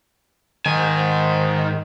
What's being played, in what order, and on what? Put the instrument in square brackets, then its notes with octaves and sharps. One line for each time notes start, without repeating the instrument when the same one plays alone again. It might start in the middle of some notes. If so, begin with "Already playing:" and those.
[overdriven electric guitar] G#2 G#5 [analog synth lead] D#3